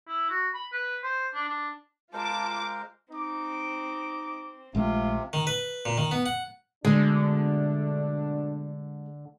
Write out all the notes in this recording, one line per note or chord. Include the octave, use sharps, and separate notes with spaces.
E4
F#4
B5
B4
C5
D4
D4
G#3 F4 A#4 C5 A5 D6
C4 D#4 D6
A#1 C3 G#3 A3 F4
D#3
B4
A#2
D#3
B3
F#5
B2 D3 G#3 A3 D4